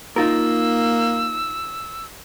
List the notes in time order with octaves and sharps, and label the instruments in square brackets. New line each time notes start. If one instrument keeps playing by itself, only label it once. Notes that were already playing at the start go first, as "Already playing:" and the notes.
[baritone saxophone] A#3 [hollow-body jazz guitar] D#4 F4 A#4 [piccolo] E6